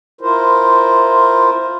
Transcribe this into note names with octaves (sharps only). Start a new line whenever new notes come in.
E4 F4 A#4 C5